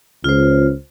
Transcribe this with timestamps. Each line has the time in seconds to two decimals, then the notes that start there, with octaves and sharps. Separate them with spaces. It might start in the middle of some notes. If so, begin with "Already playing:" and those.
0.24 C#2 F4 C5